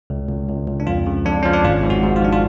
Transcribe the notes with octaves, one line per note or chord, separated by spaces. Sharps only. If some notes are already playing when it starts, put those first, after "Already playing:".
C#2
C#2
C#2
C#2
D4
F2 F4
C#3
F2 D4
F3 C#4
D4
G#1 F4
G#2
F#4
G#2
F4
F3 D4
F4